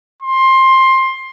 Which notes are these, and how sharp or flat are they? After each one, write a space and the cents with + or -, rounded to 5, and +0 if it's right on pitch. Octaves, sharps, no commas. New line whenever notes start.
C6 +15